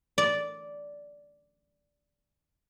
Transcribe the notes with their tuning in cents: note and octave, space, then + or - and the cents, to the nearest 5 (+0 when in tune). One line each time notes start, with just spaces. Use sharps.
D5 -10